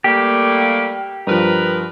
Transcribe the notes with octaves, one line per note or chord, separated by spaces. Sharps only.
G3 A3 A#3 G4
G2 F3 A#4 B4